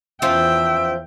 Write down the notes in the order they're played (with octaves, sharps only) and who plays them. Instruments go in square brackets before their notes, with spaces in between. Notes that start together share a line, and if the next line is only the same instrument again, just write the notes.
[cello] E2 G5 [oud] F3 C#4 F4 [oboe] E5